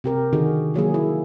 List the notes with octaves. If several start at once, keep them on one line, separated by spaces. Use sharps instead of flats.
C3 G4 A#4
D3 D#3 D#4 F#4 G#4
F3 F#3 A#3 G#4
E4